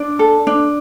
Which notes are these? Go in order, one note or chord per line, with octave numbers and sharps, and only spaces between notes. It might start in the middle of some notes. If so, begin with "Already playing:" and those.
Already playing: D4 D5
A4
D4